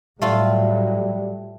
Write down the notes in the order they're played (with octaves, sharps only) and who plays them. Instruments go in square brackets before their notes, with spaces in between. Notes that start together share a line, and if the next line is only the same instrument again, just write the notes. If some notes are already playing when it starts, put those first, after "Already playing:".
[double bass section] A2 F#3 [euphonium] G3 [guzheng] A3 F4